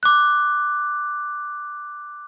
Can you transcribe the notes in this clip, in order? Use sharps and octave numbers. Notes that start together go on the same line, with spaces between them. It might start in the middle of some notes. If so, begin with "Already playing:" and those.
D6 F#6